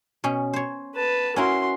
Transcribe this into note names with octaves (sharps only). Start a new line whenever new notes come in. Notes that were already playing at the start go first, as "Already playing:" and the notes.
B2 C#4
C5 C#5
B4 A5
C#4 E4 F#4 A#4 C6